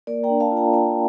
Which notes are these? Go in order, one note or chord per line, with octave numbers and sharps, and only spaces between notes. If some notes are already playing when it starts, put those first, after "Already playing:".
A#3 A#4 D5
G5 A#5
D4
F5 A5
F4
G5 A#5
A#3 G5 A#5